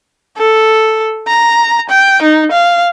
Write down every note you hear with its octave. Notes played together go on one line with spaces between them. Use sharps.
A4
A#5
G5
D#4
F5